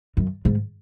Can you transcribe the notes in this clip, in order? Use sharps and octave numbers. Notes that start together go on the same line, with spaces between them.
F#2
G#2